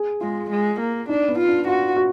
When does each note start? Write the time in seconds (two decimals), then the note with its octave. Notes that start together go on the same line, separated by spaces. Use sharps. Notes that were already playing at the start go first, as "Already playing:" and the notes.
Already playing: G#4
0.21 G#3 F4
0.50 G#3
0.80 A#3
1.09 D4 D#4
1.28 B3
1.38 F4
1.48 D4
1.67 F4 F#4
1.97 F#4